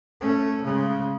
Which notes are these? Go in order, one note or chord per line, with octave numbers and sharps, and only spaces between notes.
A3 C#4
C#3 G#3